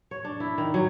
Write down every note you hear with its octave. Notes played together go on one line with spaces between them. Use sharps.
C#5
D4
E4
D#3
F#3